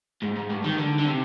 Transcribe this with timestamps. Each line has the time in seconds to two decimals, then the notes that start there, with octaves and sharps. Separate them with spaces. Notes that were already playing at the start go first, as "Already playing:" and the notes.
0.22 G#2
0.36 G#2
0.50 G2
0.65 D#3
0.78 D3
0.99 D3
1.05 C3